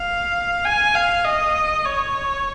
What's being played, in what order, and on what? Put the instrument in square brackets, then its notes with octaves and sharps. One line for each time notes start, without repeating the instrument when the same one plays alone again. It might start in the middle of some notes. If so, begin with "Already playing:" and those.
Already playing: [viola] F5
G#5
F5
D#5
C#5